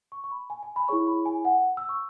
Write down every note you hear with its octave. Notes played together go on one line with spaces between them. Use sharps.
C#6
C#6
B5
G#5
G#5
B5
E4 G#4 C#5 C#6
B5
G#5
F#5
E6
C#6